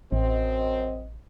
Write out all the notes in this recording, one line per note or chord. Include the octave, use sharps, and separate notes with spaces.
A1 F#2 C4 D#5